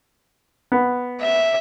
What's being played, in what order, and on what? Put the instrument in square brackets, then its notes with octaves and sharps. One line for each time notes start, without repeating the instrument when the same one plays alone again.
[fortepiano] B3
[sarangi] E5